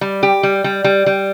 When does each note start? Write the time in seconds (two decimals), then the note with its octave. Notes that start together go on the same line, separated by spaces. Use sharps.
0.01 G3
0.23 G4
0.43 G3
0.64 G3
0.84 G3
1.06 G3